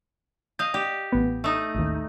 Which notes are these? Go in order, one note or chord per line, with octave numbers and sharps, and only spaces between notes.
D#5 F5 G6
G4 D5
A1 B3
A3 D#4
A1 D#2